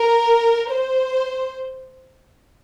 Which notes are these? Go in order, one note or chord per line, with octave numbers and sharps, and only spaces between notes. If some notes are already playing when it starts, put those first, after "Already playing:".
Already playing: A#4
C5